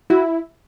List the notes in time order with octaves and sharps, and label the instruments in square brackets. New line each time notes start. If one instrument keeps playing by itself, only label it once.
[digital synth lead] E4 [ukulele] F#4